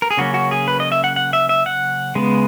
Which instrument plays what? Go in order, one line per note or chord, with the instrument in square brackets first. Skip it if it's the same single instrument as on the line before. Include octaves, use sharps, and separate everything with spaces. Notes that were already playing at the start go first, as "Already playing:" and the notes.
[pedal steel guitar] A#4
G#4
C#3 F#3 A#3 C#4 F#4
F#4
G#4
B4
D#5
E5
F#5
F#5
E5
E5
F#5
C#3 G#3 B3